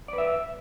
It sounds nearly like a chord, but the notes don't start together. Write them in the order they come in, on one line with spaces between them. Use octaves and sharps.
D5 B4 E5